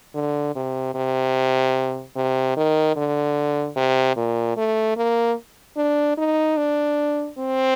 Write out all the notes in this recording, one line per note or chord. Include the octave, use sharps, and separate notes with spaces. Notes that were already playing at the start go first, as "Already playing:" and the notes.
D3
C3
C3
C3
D#3
D3
C3
A#2
A3
A#3
D4
D#4
D4
C4